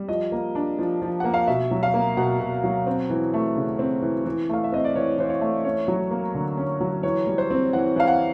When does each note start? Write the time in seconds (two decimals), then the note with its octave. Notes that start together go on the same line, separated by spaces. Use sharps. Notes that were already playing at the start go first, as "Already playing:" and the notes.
Already playing: G3
0.09 F3 D#5
0.32 A#3
0.55 D4
0.79 F3
1.02 F3
1.20 A#3 F#5
1.34 F5
1.47 B2 E5
1.71 F#3
1.83 F5
1.94 A#3
2.17 B2 F#5
2.40 B2
2.64 F#3
2.87 C4
3.10 E3
3.34 A3
3.56 C#3
3.79 C4
4.02 E3
4.25 E3
4.49 A3 F5
4.64 E5
4.72 C4 D#5
4.84 D5
4.95 E3 C#5
5.18 E3 C5
5.30 C#5
5.41 A3
5.65 C#4 C#5
5.88 F#3
6.11 A#3
6.34 D3
6.57 C#4
6.81 F#3
7.03 E3 C#5
7.27 G3
7.38 C5
7.50 C4
7.73 E3 F#5
7.96 E3 F5
8.08 F#5